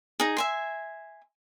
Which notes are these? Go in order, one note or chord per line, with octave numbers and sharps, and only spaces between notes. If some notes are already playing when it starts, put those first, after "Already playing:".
D#4 G#4
E5 G#5 C6